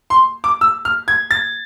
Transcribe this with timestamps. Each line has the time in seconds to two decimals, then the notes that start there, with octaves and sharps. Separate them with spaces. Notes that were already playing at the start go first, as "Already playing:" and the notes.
0.10 C6
0.44 D6
0.61 E6
0.85 F6
1.08 G#6
1.31 A6